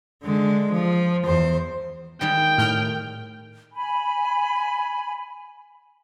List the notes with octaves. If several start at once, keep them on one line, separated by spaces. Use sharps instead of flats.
D3 G#3
F3
E2 C5
D#3 G3 G#3 G5
A2 F6 G6
G#5 B5